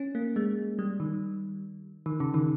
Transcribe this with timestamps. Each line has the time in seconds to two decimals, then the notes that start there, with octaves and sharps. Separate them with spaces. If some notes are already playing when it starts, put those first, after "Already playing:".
Already playing: C#4
0.15 A#3
0.36 G#3
0.79 G3
1.00 D#3
2.06 D#3
2.20 C#3
2.34 D#3